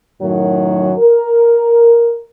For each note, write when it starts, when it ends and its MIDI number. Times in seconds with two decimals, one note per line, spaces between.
0.21 0.93 42
0.21 0.93 45
0.21 0.93 51
0.21 0.93 54
0.98 2.24 70